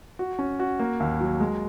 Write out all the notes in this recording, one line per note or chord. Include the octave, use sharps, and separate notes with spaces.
F#4
C#4
F#4
A#3
D#2
F#3
G#3